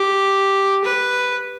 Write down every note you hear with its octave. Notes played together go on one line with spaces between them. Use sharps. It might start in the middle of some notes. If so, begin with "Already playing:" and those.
Already playing: G4
B4